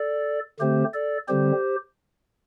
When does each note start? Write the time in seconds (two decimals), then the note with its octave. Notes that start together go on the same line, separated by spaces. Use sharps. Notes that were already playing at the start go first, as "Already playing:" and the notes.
Already playing: A4 D5
0.59 D3 A3 C4 G4 C5
0.94 A4 D5
1.28 D3 G3 C4 G4 C5